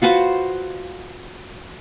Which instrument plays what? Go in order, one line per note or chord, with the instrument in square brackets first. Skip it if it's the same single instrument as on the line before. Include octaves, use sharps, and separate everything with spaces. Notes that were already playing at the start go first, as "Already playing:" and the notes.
[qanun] F4 F#4 B4 C5